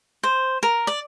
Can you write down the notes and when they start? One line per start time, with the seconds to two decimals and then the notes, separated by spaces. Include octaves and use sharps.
0.23 C5
0.63 A#4
0.87 D5